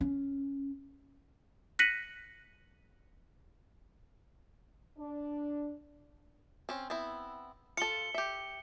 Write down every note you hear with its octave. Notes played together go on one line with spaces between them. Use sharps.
C#4
F#6 A#6 B6 C#7 D#7 F#7
D4
C4 C#4
B3 C4 E4
F4 A4 C#7 G7
G4 E5